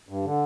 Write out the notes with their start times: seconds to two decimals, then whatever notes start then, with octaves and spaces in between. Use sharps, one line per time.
0.09 G2
0.24 D3